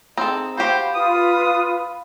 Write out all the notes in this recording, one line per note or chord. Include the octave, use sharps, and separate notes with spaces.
C4 D#4 G#4 A4
F#4 G4 C5 F5 B5
F4 B4 D#6